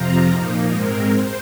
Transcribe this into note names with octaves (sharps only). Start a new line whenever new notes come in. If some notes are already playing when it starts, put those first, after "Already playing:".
Already playing: F2 C3 F3 C4 F4 A#5
A#2 F3 A#3 D#4
G#2 G#3 C4 A#4
C5